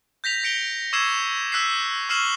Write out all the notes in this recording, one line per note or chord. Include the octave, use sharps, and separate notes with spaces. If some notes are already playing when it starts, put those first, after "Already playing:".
G6 A#6 B6 F7
A#6 C#7 D7 F7 G7
C#6 D6 E6 G#6 C7 E7
E6 F#6 B6 C7
C#6 E6 F6 C7 E7 F#7